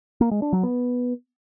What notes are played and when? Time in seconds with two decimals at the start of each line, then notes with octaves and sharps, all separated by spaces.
0.21 A#3
0.31 G#3
0.42 D4
0.53 F#3
0.63 B3